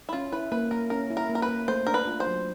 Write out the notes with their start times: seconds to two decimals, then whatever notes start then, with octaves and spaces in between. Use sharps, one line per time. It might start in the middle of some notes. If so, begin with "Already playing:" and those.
0.09 E4
0.13 C#4 F4
0.32 E4 B4
0.52 A#3 B4
0.71 A#3 A#4
0.90 C#4 A#4
1.10 E4
1.17 A#4
1.29 A#3
1.35 A#4
1.42 B4
1.48 A#3
1.68 A3 C5
1.87 D4 A#4
1.94 B4
2.07 F4
2.20 C5
2.27 F#3